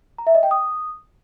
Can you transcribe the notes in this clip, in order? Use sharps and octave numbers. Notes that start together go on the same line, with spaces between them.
A#5
E5
D#5
G5
D#6